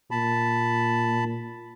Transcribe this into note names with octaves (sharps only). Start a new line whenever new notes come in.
A#2 A5 B5